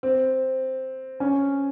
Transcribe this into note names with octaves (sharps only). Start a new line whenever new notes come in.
C4
C#4